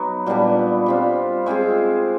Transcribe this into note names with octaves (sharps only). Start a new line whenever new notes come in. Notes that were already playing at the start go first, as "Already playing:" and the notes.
Already playing: F#3 B3 D#4
A#2 G3 B3 D4
G3 C4 F4
G#3 C4 F4 G#4